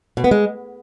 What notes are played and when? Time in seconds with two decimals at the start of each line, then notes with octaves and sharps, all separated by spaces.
0.17 B2
0.24 B3
0.31 G#3